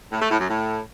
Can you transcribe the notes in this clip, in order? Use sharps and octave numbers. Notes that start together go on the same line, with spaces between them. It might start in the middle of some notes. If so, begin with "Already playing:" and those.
A2
A3
A2
F#2
A2